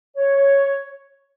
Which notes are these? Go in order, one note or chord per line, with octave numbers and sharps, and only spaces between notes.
C#5